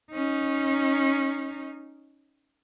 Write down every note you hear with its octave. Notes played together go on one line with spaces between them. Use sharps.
C#4 D#4